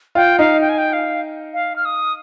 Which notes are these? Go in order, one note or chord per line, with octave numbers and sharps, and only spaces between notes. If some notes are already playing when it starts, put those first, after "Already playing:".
F4 G5
D#4 F5
G5
G#5
G5
F5
F5
F6
D#6